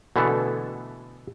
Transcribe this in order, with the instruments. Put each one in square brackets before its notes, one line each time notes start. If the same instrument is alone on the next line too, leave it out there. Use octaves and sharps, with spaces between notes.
[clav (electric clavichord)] B2 D3 E3 A3 B3 A4